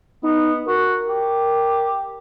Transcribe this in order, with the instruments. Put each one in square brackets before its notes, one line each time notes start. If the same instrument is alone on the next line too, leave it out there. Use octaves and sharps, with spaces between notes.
[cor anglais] B3 [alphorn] D#4
[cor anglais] F#4 [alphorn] A#4
[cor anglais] G4